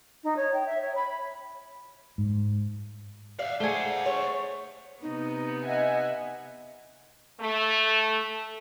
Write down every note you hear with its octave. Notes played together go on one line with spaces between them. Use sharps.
D#4
C#5
G5
E5
C#5
B5
G#2
D5 E5 F5
A3 G#4 C5 F#5
C#5
C3 B3 D#4
D#5 E5 F#5 G#5
A3